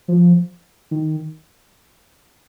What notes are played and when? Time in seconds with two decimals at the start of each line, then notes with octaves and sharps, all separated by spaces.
0.08 F3
0.91 D#3